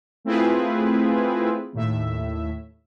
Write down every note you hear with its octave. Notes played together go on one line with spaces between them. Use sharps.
A3 C4 E4 F4 G#4 B4
D#2 A2 E5